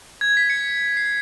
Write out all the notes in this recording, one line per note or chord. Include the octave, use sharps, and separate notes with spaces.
G#6
B6
C#7
C7